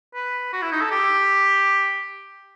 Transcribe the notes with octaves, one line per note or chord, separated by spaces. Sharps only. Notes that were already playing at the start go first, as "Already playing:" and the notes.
B4
F#4
E4
D#4
A4
G4